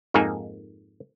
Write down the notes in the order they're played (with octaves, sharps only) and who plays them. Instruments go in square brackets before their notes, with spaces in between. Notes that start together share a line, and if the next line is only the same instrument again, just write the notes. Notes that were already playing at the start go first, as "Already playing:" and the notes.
[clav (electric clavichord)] F2 G#2 A#3 D#4 G#5